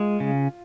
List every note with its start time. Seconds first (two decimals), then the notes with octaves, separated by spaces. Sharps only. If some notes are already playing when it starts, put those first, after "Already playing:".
Already playing: G#3 F4
0.20 C#3